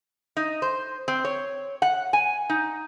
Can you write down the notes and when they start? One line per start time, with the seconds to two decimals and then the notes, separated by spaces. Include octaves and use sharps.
0.37 D#4
0.62 C5
1.08 C4
1.25 C#5
1.82 F#5
2.13 G#5
2.50 D#4